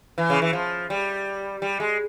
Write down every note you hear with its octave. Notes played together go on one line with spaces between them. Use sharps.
E3
C#3
E3
F3
G3
G3
G#3